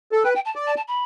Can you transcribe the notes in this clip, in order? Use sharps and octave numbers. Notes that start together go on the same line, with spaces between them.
A4
B4 G5
G5
A5
D5
A5
A5
B5